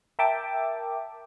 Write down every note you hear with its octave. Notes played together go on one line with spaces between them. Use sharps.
A#4 E5 G5 A5 D6